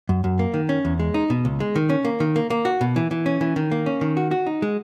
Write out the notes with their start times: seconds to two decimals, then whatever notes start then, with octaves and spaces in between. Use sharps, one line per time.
0.09 F#2
0.24 F#2
0.39 A#3
0.54 D#3
0.69 C#4
0.85 E2
0.99 G#3
1.14 D#4
1.30 B2
1.45 C#2
1.60 G#3
1.76 D#3
1.90 C#4
2.05 A#3
2.20 D#3
2.36 A#3
2.50 A#3
2.65 F#4
2.81 B2
2.96 E3
3.11 E3
3.26 C#4
3.41 E3
3.56 D#3
3.71 A#3
3.86 C#4
4.01 D#3
4.17 F#4
4.31 F#4
4.46 D#4
4.62 G#3